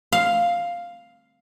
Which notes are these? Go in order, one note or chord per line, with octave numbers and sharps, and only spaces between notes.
F5